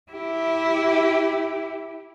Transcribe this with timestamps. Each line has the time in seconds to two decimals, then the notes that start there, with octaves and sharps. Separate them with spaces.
0.11 E4 G4